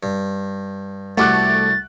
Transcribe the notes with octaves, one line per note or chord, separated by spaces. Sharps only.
G2
C2 A3 F#4 G4 F#5 D6 F#6 A6